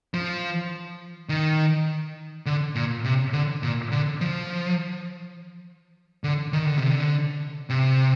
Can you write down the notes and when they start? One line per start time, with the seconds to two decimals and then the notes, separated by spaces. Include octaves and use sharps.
0.14 F3
1.29 D#3
2.46 D3
2.75 A#2
3.05 C3
3.33 D3
3.63 A#2
3.92 D3
4.21 F3
6.24 D3
6.53 D#3
6.66 D3
6.78 C3
6.90 D3
7.70 C3